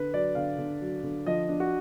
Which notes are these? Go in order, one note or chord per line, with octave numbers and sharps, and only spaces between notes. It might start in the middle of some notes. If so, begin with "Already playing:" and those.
Already playing: D3 B4
F#3 D5
D3 F5
D3
F#3
D3
F3 D#5
D4
F#4